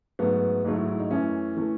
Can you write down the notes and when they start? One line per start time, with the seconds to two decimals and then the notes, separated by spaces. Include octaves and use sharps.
0.19 G#2 F#3 A3 B3
0.65 G#2 F#3 A3 D#4
0.76 E4
0.88 E4
0.99 D#4
1.11 F#2 E3 A3 C#4
1.57 E3 A3